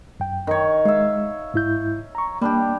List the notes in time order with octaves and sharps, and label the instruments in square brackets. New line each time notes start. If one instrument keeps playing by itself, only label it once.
[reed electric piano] F#2 G5
[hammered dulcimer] D#3 C#5
[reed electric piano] G#3 [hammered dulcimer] E5 F5
[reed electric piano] G#2 E4 G6
A#5 C#6
[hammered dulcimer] G3 D4 G4 [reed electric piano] A#3